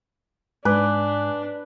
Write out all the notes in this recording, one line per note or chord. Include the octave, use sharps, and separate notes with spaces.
G#2 D4 B4 G#5 D6